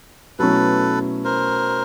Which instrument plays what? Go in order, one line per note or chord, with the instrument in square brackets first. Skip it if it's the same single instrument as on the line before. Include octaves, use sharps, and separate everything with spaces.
[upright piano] B2 F#3 A3 C#4 E4 [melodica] A4 B4
[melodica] A#4 C5